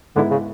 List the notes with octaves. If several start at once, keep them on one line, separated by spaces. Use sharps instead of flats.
G#2 D3 G#3 B3 E4
C#3